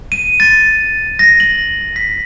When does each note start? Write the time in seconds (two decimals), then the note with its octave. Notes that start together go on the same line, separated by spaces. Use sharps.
0.12 D#7
0.40 A6
1.19 A#6
1.40 F#7
1.96 B6